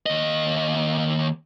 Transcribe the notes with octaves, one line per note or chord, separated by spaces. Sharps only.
D#2 D#5